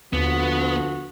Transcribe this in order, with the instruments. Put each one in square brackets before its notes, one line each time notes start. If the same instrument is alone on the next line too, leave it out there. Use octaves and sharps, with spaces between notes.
[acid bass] D#2 [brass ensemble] D3 F3 F#4 [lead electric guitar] B3